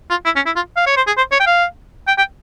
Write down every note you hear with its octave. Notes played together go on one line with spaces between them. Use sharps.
F4
E4
C#4
E4
F4
F5
C#5
C5
G#4
C5
C#5
G5
F5
G5
G5